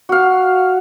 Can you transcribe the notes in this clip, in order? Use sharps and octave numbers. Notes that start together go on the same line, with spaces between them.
F#4 F5